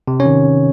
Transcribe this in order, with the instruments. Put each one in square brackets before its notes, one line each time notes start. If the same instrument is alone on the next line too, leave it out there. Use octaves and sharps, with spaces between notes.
[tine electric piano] C3
C#4 C#5
D#3